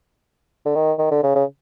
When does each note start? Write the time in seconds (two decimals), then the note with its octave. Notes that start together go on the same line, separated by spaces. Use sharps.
0.66 D3
0.75 D#3
0.99 D#3
1.11 D3
1.23 C#3
1.35 C#3